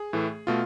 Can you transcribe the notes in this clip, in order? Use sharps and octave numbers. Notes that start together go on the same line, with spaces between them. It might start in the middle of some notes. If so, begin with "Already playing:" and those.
Already playing: G#4
A2 E3 A3
B2 A3 F4